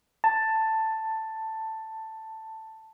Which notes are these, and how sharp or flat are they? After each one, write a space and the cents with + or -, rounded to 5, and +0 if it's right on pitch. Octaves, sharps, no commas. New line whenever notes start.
A5 +10